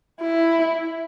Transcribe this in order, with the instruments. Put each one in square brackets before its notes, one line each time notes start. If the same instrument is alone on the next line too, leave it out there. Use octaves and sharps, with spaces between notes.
[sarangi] E4